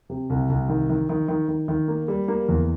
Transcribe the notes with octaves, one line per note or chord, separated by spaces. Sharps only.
C3
C2
C2
D#3
D#3
D#3
D#3
D#3
D#3
A#3
G3
A#3
E2